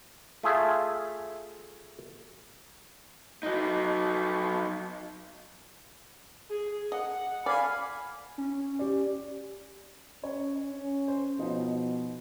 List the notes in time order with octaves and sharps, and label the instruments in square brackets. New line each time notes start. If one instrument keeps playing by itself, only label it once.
[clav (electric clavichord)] A3 F4 G#4 E5
[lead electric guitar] F#3 D#4
[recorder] G#4
[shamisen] D#5 [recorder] F#5
[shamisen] D5 [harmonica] F5 G#5 B5
[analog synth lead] C#4
[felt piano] G4 D5
[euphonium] C#4 [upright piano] C#5
[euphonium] C#4
[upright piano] C5
[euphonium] B2 [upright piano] F3 D#4 C5